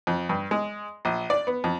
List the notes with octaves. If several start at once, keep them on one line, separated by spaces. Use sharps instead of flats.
F2
G2
G#3
A#1
D5
B3
F2